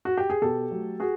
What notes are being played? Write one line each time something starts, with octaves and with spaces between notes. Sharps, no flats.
F#4
G4
G#4
B2 G4 A4
F#3 A3
F#4 G#4